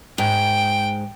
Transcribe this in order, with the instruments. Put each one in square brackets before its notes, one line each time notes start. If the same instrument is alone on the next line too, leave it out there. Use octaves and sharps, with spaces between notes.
[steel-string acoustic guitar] G#2 [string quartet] G5